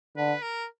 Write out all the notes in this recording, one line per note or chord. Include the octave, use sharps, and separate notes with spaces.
D3 B4
A#4